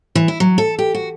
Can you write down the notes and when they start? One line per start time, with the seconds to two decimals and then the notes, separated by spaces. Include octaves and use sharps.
0.15 E3
0.28 E4
0.40 F#3
0.58 A4
0.79 G4
0.95 F#4